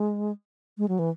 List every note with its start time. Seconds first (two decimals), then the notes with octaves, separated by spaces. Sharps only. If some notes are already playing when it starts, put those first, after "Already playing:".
Already playing: G#3
0.78 G#3
0.88 F#3
0.99 E3